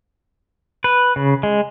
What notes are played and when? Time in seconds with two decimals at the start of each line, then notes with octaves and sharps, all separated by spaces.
0.84 B4
1.16 C#3
1.43 G#3